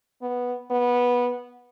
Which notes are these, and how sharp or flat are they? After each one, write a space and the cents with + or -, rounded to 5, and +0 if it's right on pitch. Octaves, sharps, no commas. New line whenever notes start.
B3 -5
B3 -15